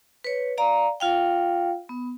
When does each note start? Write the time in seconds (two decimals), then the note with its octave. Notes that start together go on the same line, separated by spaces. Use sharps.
0.24 B4 C#5
0.58 D5 F5 A#5
1.00 F4 F5 G5
1.89 B3